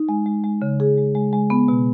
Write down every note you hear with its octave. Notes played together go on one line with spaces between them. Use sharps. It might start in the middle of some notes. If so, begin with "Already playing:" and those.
Already playing: D#4
G#3
G#3
G#3
C#3
G#4
G#3
G#3
G#3
B3
B2